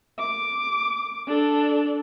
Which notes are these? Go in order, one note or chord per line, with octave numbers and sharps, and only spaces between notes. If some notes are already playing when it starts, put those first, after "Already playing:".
D6
D4 A4